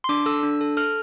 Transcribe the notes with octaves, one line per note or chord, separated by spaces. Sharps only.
C6
D4 D6
A4 E6
D4
A4
A4 F6